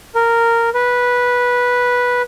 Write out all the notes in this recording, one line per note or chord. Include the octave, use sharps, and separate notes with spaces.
A#4
B4